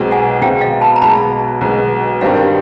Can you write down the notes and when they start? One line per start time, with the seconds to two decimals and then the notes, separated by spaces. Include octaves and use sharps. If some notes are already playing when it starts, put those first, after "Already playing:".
Already playing: B1 B2 G#3 C4
0.11 F#5 G#5
0.41 B1 B2 G#3 C4 F5 G5
0.61 D#5 F5
0.81 A5 B5
0.96 A#5
1.01 B1 B2 G#3 A5 B5
1.61 B1 B2 G#3
2.21 G2 D#3 G3 C4 D#5 F5